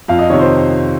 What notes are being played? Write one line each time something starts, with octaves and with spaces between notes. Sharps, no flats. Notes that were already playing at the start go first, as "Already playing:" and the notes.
F2 F5
D#5
C3 D#3 C#5
C5